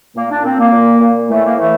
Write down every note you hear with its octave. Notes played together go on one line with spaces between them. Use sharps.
A#2 A#3
D4
A#2 C4
A#3
A#2
A#2
A2 E3 A3
A#3
A2 E3 A3